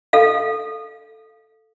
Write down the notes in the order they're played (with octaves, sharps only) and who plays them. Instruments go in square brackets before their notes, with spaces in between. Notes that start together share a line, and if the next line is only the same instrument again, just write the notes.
[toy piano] A4 F5